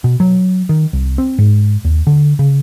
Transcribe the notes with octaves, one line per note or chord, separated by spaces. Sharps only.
B2
F#3
D#3
C2
C4
G#2
D#2
D3
C#3